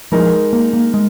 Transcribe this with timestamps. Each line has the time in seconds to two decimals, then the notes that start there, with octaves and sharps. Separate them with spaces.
0.12 F3 G#3 D#4 A#4
0.53 A#3
0.73 A#3
0.94 G#3